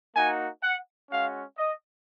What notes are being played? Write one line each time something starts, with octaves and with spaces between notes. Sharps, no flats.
A#3 D#4 F#4 G#5
F#5
G#3 C#4 F#4 F5
D#5